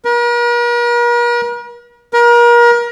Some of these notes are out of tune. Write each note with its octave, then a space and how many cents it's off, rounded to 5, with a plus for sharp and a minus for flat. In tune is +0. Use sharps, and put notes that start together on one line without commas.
A#4 +45
A#4 +35